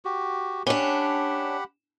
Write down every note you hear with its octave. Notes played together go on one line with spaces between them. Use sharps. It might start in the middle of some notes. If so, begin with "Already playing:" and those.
F#4 G4
C#4 D4 G4 F#5 B5